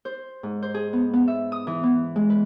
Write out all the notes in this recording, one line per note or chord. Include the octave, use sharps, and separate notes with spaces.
C5
G#2
C5
G#4
B3
B3
E5
D#6
E3
B3
G#3
B4